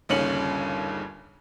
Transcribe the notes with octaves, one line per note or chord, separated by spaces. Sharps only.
G1 D#2 C#3 C#4 C#7 F#7